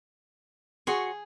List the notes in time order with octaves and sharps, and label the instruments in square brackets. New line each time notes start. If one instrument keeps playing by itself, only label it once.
[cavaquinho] F#4 C#5 C6 [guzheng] G#4